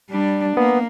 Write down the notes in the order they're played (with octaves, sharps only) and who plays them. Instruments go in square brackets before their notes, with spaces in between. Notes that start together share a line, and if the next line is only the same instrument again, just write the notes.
[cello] G3 D4
[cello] A#3 [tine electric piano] B3